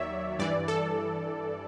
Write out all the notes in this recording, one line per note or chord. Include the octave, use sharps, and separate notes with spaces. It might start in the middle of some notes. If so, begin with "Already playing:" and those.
Already playing: D#2 D#3 F#3 C#5 D5 E5
G2 E3 D5
A4